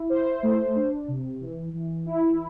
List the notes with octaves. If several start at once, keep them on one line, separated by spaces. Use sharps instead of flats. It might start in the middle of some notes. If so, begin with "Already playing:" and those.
Already playing: E4
C5
A3
D4
C3
E3
E3
E4